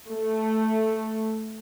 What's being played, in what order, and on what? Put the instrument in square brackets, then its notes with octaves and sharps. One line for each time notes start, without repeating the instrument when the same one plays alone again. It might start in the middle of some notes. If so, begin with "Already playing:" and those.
[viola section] A3